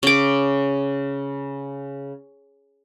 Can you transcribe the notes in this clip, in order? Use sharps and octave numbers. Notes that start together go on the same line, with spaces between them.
C#3 D6